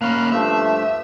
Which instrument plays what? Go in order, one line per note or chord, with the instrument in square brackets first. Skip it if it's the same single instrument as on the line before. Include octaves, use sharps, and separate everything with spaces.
[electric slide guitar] A#3 C#4 A#4 [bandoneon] F5 B5 F#6
[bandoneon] G2 F3 A3 [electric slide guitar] E5